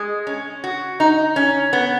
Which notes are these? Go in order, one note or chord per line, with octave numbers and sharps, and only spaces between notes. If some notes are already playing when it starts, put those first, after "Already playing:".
Already playing: G#3
C#4
F#4
D#4
C#4
B3